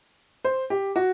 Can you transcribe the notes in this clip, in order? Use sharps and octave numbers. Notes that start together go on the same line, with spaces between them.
C5
G4
F#4